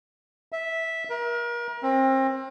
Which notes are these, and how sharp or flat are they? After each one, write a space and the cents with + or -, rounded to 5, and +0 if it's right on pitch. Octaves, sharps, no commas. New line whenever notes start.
E5 -10
A#4 +35
C4 +30